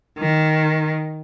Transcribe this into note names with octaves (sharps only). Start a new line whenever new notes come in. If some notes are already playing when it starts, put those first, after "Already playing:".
D#3